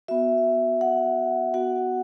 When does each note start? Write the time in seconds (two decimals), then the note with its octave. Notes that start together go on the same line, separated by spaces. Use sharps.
0.08 B3 F#4 E5
0.81 F#5
1.54 B3 F#4 F#5